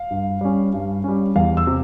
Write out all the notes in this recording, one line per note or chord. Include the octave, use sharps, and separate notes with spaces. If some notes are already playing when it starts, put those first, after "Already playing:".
Already playing: F5
G2
G3 C#4
G2
G3 C#4
E2 F5
E6
C3